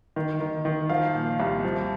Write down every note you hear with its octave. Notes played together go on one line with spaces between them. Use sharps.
D#3
D#3
D#3
F3 F5
A#2
C2
F3